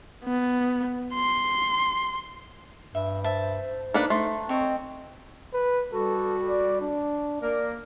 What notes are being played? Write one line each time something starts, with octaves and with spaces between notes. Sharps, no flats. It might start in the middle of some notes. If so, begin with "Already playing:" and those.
B3
C6
G2 E5
C5 E5 A5
A#3 D4 D#4 A4 B4
A3 C6
C4 C#5 D#5
B4
G3 F#4 A4
D5
D4
A#3 A#4 D5